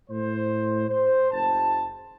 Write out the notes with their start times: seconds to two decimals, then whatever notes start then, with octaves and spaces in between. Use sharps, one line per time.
0.10 A2 C5
0.89 C5
1.31 F#1 A5